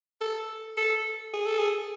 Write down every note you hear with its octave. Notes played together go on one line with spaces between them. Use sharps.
A4
A4
G#4
A4
G#4